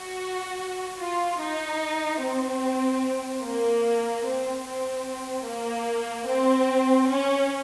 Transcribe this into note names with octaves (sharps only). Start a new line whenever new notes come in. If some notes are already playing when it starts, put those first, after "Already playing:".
Already playing: F#4
F4
D#4
C4
A#3
C4
C4
A#3
C4
C#4